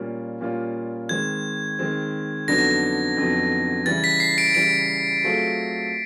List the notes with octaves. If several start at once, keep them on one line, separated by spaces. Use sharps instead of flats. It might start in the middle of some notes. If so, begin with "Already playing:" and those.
Already playing: A#2 G3 A#3 C#4 F4
A#2 G3 A#3 C#4 F4
D#3 G#3 C4 G#6
D#3 G#3 C4
F2 D3 F#3 B3 D#4 A#6
F2 D3 F#3 B3 D#4
C#3 E3 G3 A6
B6
C7
D7
C#3 E3 G3 D7
F#3 A3 C4 F4 G#4